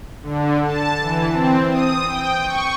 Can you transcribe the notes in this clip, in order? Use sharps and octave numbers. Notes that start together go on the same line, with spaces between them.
D3
A5
E3
C4
D#6
G5
C#6